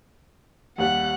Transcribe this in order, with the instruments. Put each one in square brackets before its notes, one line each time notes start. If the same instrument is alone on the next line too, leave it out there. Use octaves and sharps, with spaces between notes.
[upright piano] D#2 G3 [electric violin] F#5 F#6